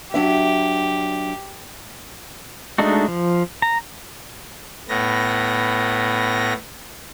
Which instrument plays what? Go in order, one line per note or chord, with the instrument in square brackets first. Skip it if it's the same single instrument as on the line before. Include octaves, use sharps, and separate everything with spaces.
[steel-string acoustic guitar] F#3 D4 E5 [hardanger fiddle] G4
[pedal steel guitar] G#3 A3 D4 D#4 F#4
F3
A#5
[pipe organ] A2 B3 A#6